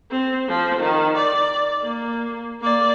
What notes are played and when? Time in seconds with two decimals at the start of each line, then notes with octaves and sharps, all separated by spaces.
0.11 C4
0.48 F3
0.79 D#3
1.17 D5
1.84 A#3
2.61 A#3 D5